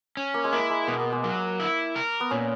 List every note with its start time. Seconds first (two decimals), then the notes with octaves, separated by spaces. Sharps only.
0.17 C#4
0.34 A#3
0.44 G#3
0.52 A#3 E4
0.70 G#3
0.88 B2 B3
1.00 A#3
1.12 G#3
1.23 F#3 A#3
1.60 E4
1.96 A#4
2.20 B3
2.30 A#2 C#4